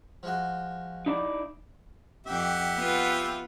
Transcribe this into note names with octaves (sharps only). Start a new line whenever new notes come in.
F3 G#3 F#4
D#4 E4 D5
F2 G4 E5 F#5
B3 F4 B4